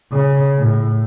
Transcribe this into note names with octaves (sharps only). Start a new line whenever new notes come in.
C#3
A2